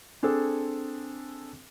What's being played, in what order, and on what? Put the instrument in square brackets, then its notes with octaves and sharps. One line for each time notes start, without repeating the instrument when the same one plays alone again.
[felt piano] C4 D4 G#4 A4